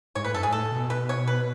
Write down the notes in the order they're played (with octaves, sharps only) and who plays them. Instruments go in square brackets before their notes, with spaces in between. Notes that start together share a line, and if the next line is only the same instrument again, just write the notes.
[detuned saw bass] G#2 [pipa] C#5
[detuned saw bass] A2 [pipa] B4
[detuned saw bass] F#2 [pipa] A4
[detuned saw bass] G#2 [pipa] G#4
[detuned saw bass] A2 [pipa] A4
[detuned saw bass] B2
[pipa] B4
C#5
B4